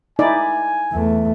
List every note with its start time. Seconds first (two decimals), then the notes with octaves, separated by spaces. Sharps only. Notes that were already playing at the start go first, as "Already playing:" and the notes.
0.19 D#4 E4 D5 G#5
0.92 E2 A3